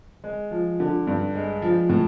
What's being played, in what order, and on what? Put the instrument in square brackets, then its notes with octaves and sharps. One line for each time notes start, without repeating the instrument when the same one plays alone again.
[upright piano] G#3
F3
D3
G2
G#3
F3
A2